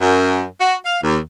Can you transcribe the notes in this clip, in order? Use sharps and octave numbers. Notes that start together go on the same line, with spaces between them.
F#2
F#4
F5
D#2